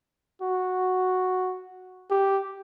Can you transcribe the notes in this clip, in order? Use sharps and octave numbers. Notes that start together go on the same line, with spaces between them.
F#4
G4